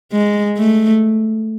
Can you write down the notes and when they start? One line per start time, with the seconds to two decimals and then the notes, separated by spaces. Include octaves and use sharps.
0.12 G#3
0.58 A3